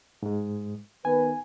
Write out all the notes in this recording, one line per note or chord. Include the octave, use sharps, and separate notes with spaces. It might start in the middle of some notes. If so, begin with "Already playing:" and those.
G#2 G#3
D#3 B3 B4 G#5